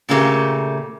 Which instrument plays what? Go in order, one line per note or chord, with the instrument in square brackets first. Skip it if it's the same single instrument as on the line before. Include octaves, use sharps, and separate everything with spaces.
[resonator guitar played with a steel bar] A#2 C#3 A3 A#3 G4